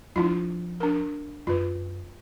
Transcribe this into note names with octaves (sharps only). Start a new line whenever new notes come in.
F3 C4 D4 E4 F4
D4 A#4
F#2 F4 B4